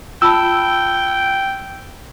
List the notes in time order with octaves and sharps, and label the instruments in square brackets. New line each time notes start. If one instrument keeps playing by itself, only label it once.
[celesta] F4 A5 B5 [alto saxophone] G5 [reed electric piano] E6